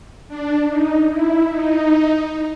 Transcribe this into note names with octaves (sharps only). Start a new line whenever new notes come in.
D4
D#4
E4
D#4